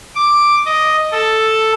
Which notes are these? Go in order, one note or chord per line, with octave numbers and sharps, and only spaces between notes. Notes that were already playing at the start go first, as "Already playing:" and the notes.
D6
D#5
A4